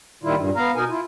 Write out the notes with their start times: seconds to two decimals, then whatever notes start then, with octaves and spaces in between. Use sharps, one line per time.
0.23 A#2 D#3 G3 E4 F4
0.35 G2 A#2
0.56 B3 F5 A#5
0.75 B2 D#4 A#4 G#5
0.89 E4 F4